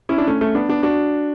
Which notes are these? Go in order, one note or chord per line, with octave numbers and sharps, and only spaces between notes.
C#4 E4
D4
A3 C#4
A3 C#4
B3 D4
B3 D4
D4 F#4